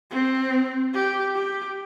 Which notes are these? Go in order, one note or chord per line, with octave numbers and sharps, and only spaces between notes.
C4
G4
G4